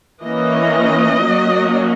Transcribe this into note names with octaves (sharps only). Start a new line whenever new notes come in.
E3 A#3 C#4 D#5
F#3 A#3 C#4